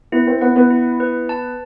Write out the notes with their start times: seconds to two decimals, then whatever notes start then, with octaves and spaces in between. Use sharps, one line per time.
0.12 B3 E4
0.27 C4
0.41 B3 F#5
0.56 B3
0.70 E4
1.00 B4
1.29 A5